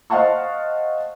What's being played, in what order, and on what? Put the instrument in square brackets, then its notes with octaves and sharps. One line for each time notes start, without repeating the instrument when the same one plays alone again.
[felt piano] C5 D#5 F5 F#5 A5 C#6